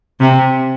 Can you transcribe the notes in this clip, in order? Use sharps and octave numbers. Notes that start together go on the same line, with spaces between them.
C3